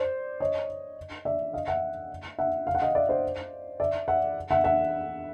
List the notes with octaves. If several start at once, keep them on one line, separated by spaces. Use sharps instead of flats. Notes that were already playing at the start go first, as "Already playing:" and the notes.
Already playing: C5 D5
C#5 D#5
D5 E5
D#5 F5
E5 F#5
E5 F#5
F5
F#5
D#5 F5
D5 E5
C5 D5
D5 E5
E5 F#5
E5 F#5
E5 F#5